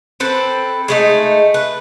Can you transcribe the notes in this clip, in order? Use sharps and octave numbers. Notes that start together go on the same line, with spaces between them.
C4 A4 B4
G#3 A3 D#4
B4